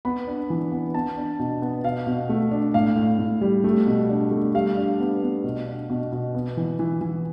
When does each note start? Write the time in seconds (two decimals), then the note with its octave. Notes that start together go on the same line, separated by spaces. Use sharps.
0.05 B3 B5
0.27 D4
0.50 E3
0.72 B3
0.94 B3 A5
1.17 D4
1.39 B2
1.62 B3
1.84 B2 F5
2.07 B2
2.29 A3
2.52 D4
2.74 A2 F5
2.96 A2
3.19 A2
3.41 G3
3.64 A3
3.86 B2
4.09 D4
4.31 A3
4.54 G3 F5
4.77 D4
5.00 B3
5.22 B3
5.44 B2
5.67 D4
5.90 B2
6.12 B2
6.35 B3
6.57 E3
6.79 E3
7.01 E3